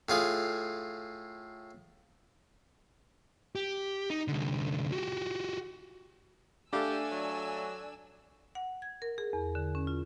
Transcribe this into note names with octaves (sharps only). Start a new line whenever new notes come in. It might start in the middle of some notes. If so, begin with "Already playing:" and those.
A2 F4 G#4
G4
D#4
C2 D3
F#4 G4
A3 D4 G4 A4 D5 F5 G#5 E6
F#3
F#5
G#6
A#4
G#4
E2
D3
C#4
F4